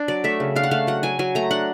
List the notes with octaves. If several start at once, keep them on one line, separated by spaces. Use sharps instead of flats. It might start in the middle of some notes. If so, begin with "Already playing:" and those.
Already playing: D4
F#3 D5
A3 E5
C#3
D4 F5
F#5
A3 F5
F#3 F#5
F#3 G#5
F#3 G#5
A3 A#5
D4 F#5